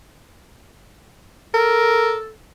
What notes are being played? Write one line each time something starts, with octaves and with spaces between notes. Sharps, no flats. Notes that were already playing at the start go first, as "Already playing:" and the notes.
A4 A#4